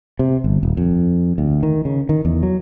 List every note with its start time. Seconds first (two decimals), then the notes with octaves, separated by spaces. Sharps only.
0.19 C3
0.44 G1
0.63 D#1
0.77 F2
1.38 D2
1.63 D#3
1.85 C#3
2.09 D#3
2.25 E2
2.43 F#3